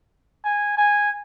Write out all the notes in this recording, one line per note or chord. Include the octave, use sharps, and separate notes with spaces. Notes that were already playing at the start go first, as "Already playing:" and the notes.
G#5
G#5